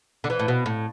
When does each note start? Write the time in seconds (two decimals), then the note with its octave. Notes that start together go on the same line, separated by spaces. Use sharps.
0.24 D3
0.30 E3
0.39 A2
0.48 B2
0.66 A2